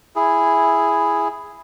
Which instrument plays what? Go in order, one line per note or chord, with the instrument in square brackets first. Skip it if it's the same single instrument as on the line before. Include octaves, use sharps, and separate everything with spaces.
[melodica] E4 G#4